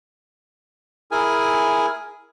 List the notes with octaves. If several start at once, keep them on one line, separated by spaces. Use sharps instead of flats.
E4 G#4 A#4 G#5